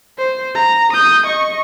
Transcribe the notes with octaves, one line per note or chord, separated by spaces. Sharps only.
C5
A#5
D#6 G6
D#5 C#6